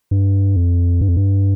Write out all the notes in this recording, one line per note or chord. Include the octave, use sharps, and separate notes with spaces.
G2
F2
G2
F2
G2